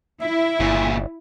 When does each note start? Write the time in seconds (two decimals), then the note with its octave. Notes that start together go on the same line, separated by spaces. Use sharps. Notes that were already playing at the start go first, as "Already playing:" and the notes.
0.21 E4 E5
0.60 G1 A#2 C#3